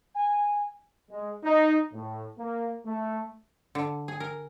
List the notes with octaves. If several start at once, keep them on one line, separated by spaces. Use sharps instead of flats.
G#5
G#3
D#4
A2
A#3
A3
D3
G#4
A#4